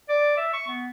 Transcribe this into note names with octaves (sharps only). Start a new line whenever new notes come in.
D5
E5
C#6
B3